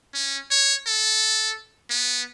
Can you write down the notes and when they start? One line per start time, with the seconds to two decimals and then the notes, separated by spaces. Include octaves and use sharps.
0.14 C#4
0.51 C#5
0.86 A4
1.90 B3